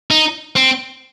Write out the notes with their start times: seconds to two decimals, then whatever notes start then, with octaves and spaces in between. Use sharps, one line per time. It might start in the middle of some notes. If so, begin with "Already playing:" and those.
0.11 D#4
0.56 C4